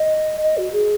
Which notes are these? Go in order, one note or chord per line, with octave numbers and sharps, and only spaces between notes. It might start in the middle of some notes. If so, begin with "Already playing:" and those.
Already playing: D#5
D#5
F#4
G#4